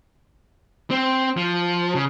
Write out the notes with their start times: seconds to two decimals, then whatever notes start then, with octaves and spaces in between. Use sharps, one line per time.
0.91 C4
1.37 F3
1.95 C#3